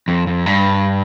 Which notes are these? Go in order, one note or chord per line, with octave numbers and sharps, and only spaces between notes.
F2
F2
G2